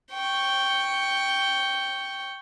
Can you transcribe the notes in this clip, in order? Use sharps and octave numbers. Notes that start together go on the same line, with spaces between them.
G5 C#6